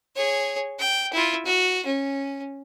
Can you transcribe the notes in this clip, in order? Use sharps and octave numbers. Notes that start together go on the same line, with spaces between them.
G#4 C#5
G5
E4 F4
F#4
C#4